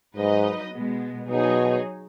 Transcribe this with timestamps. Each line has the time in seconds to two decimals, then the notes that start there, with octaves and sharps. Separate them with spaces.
0.17 G#2 F#3 D#4 B4 D#5
0.73 B2 G#3 B3
1.29 B2 F#3 D#4 G#4 C#5